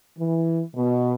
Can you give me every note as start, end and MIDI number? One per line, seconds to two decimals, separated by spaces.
0.18 0.62 52
0.74 1.14 47